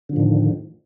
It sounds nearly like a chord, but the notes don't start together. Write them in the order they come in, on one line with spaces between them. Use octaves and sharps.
D3 F3 A2 D#3